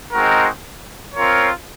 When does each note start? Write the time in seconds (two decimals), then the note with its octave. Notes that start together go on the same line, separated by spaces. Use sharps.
0.13 G#3 C4 D#4 F#4 A#4
1.15 C4 F4 A#4 C#5